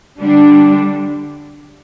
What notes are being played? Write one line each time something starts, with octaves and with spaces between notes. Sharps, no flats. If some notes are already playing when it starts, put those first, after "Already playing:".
D3 G3 D4